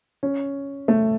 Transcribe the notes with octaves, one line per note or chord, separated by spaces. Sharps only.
C#4
A3